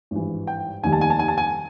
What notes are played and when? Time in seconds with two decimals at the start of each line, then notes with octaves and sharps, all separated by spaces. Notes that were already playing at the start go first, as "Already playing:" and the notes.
0.11 G#1 G2 E3
0.47 G5
0.83 F1 D#2 D#3 G3 G#5
0.93 A5
1.01 G#5
1.10 A5
1.19 G#5
1.28 A5
1.38 G#5